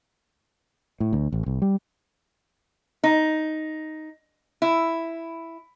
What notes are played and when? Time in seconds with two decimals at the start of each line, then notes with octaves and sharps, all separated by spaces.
1.00 A2
1.13 D2
1.32 A1
1.46 C2
1.62 G3
3.04 D#4
4.62 E4